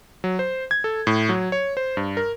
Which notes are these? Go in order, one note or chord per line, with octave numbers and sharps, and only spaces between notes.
F#3
C5
G#6
A4
A2
F#3
C#5
C5
G2
A#4